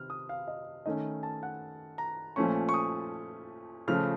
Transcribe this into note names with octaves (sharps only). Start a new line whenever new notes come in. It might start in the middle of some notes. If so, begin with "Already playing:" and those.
Already playing: C3 D#3 F6
D#6
F5
D#5
D#3 A3 C#4 D#5
A5
F#5
A#5
A#2 F3 A3 C#4 C#6
C#6
D#6
C#3 F3 A3 F6